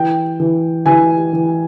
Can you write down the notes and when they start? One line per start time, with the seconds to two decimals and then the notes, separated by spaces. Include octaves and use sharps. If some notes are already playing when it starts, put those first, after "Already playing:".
Already playing: E3 G5
0.40 E3
0.86 E3 G#5
1.33 E3